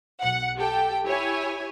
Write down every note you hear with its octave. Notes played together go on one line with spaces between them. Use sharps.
B1 F#5
G4 A4 G5
E4 G4 C#5 G#5